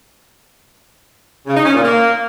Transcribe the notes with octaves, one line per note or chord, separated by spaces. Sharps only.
C#3
D#4
C#4
A#2
A#3